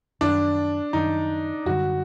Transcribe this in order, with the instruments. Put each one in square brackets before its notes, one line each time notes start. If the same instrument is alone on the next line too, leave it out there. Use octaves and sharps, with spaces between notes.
[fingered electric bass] F#2 D#3 G3 [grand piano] D4
[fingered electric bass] F#2 D#3 G3 [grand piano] D#4
[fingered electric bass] F#2 D3 G3 [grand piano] F#4